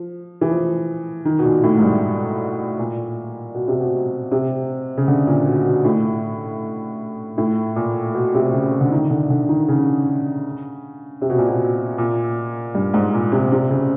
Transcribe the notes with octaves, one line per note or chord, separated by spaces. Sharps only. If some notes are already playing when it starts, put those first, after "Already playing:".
Already playing: F3
E3
F3
D#3
B2
A#2
A2
G#2
G2
A#2
B2
C3
B2
C3
C#3
D3
A#2
B2
B2
A2
A2
A#2
B2
C3
C#3
D3
D#3
D3
D3
D#3
C#3
C3
B2
A#2
B2
A#2
G2
G#2
A#2
C3
C3
C#3